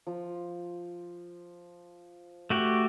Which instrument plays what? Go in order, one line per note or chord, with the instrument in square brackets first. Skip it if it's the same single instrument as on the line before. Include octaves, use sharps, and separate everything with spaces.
[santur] F3
[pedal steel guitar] A3 F#4 G4